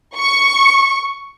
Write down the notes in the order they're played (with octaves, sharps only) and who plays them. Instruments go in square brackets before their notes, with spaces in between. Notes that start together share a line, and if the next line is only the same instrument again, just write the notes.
[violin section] C#6